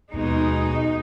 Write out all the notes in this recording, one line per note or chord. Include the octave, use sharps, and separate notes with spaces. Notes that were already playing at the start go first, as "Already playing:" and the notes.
D#2 B2 G#3 D#4